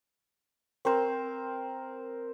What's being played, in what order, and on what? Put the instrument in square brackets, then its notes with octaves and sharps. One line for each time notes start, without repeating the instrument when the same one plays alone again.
[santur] C4 A#4 C5